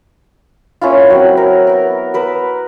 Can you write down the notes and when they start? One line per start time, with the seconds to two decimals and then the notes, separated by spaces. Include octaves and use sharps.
0.81 A#3 C#4 E4 F4
1.10 F#3 C4 F#5
1.37 A#4
1.67 B3 A#4
2.14 A#4 B4 D#6 E6